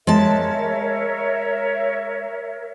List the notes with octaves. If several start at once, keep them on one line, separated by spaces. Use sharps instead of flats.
G#3 A#4 C#5 E5 A5